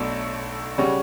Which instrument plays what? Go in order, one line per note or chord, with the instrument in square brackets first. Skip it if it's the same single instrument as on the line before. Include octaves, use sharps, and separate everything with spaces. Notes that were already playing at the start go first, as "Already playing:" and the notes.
Already playing: [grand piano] B1 B2 A3 D4 A4
C#3 G3 C#4 F#4